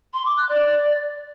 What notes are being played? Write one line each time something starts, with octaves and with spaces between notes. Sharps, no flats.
C6
D6
F#6
D5